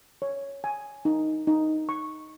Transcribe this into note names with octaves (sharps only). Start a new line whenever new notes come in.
C#5
G#5
D#4
D#4
C#6